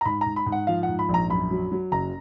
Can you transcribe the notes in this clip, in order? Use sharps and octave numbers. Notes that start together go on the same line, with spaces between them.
A#5
G#2 B5
A#5
G#2
B5
G#2
F#5
F3 F5
F#5
G#2
B5
A#1
A#5
F#2 B5
F#3
F#3
F#1 A#5